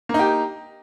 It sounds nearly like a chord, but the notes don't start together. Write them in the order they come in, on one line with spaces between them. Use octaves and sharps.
A#3 D#4 G4